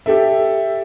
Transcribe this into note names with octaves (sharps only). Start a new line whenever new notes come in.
G4 A4 E5